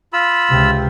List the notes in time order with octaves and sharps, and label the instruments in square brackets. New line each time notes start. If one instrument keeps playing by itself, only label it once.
[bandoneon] F4 B5 E6
[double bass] C#2 C3